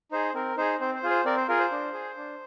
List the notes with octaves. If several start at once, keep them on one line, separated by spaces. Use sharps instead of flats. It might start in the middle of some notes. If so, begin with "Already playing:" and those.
D#4 G#4 C5
C4 A#4
D#4 G#4 C5
C4 C5
C5
F4 G#4
C5
C4 A#4 D5
C5
F4 G#4 A#4
C5
D4
G#4
D4